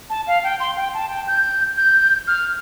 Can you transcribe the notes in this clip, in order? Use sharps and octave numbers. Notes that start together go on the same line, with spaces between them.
A5
F5
G5
C6
G5
A5
G5
G6
G6
F6